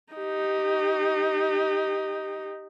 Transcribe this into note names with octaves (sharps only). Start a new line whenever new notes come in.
D#4 G4